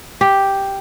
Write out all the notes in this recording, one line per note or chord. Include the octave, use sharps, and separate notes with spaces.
G4